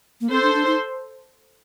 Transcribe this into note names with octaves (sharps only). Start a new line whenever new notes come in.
A#3
C4 A4 C5
D4
D4
D#4